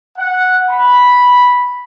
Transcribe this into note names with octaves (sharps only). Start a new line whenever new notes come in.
F#5
B5